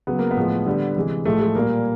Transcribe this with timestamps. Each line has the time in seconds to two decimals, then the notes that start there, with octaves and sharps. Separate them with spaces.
0.07 C#3 F#3 B3
0.19 A#3
0.31 B3
0.37 A2 F3 G#3
0.66 D3 G3
0.96 C3 E3 G#3
1.25 A2 F3 G#3 A3
1.40 G#3
1.55 A#2 G3 A#3